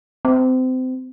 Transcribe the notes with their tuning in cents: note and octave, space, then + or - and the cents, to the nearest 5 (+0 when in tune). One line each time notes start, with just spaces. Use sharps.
C4 -30